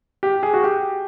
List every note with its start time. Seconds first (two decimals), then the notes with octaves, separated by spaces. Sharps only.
0.23 G4
0.43 G#4
0.54 F#4
0.63 G4